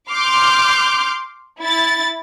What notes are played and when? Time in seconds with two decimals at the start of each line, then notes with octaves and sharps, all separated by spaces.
0.10 C6 D6 F6 G6
1.61 E4 A6